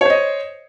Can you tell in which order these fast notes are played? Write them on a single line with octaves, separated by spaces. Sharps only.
C#5 C5 D#5